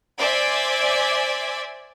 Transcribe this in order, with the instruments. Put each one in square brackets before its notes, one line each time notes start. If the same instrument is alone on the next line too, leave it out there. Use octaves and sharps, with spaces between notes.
[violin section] C5 D5 E5 G#5 D6 G#6